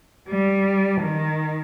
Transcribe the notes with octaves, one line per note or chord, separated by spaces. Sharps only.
G3
D#3